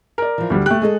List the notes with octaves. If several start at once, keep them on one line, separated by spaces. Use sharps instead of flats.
A#4 D5
E3 F3
D2 G3
A3 G4 F#6
G#3 G#4 A4 D#5